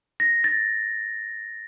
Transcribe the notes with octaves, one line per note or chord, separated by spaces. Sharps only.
A#6
A6